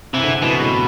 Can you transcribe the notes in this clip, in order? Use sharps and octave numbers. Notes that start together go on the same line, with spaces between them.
C3 E3
D3
B2 E3
A2